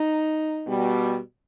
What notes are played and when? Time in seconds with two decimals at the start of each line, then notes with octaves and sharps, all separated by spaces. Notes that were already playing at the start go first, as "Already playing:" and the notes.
Already playing: D#4
0.68 B2 G3